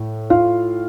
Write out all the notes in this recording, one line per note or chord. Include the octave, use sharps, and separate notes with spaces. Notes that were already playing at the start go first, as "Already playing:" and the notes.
Already playing: A2
F4 F5